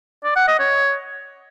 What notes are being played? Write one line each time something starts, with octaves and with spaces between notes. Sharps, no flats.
D5
F#5
D#5
C#5